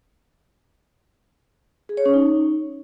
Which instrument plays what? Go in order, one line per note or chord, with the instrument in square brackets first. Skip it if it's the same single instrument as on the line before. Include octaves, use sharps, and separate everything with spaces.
[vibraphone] G#4
C#5
C#4
D#4